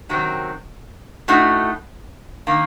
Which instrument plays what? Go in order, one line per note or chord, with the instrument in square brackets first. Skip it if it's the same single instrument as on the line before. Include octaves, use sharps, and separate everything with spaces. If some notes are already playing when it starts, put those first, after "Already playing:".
[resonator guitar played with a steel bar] C3 D#3 F#3 C4
A2 A3 D#4 F#4
D#3 A#3